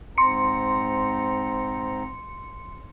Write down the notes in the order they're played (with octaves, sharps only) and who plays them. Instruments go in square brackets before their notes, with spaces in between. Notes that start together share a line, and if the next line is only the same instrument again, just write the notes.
[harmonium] G#2 C4 A#5 [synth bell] C6 C#7